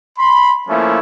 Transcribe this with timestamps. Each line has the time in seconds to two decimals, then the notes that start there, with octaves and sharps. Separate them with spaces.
0.19 B5 C6
0.69 F3 A3 A#3 C#4 E4